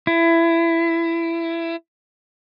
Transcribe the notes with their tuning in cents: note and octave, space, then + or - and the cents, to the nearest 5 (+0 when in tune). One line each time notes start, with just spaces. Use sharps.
E4 +20